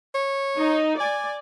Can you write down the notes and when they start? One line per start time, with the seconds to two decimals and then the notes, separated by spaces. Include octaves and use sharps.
0.15 C#5
0.59 D#4
1.00 D5 G#5